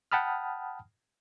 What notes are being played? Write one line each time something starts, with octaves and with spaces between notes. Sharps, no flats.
F#5 G5 A5 B5 D#6 F6